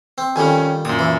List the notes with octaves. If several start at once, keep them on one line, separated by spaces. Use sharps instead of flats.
C4
F2 D#3 G3 C#4 G#5
F#2 A#2 D#6
E3